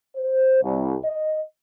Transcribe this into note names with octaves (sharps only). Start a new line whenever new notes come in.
C5
C2
D#5